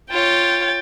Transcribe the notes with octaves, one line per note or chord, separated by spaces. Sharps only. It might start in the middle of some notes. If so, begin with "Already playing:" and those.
F4 C#5 G5 A6